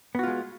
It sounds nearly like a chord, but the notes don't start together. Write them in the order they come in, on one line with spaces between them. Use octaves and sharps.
B3 F#4 F4 G#3